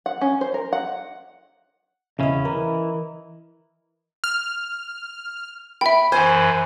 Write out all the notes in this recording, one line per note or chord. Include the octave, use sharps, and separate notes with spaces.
F#5
C#4
C5
A#4
F#5
E2 C#3 C#4 E4 D#5
E3 A#4
F6
E5 G5 B5
F#2 E3 C5 G#5